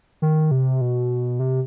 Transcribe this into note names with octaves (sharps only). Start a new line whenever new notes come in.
D#3
C3
B2
C3